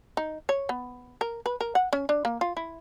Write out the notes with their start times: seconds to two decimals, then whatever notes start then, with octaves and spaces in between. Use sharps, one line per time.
0.17 D#4
0.49 C#5
0.69 B3
1.21 A#4
1.46 B4
1.61 A#4
1.75 F#5
1.93 C#4
2.09 D4
2.25 A#3
2.41 F4
2.57 E4